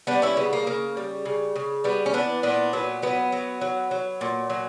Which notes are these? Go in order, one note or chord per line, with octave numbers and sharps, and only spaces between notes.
G3 B3 D4
C#4 E4
C#3 B3
A#3
C#3 A#3
G3
C#3
C#3
G3 B3
C#4
E3 B3 D4
A#2 B3 D4
F#3 B3
F#3 B3
F#3
F#3
F#3
A#2
F#3